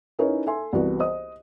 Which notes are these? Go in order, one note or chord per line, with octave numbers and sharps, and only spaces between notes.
C#4 D#4 E4 A#4 B4 C#5
A4 E5 G#5 C6
C2 E3 B3 F#4
C5 D#5 D#6